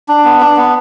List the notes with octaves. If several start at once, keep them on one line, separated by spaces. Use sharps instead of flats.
D4
B3
D4
B3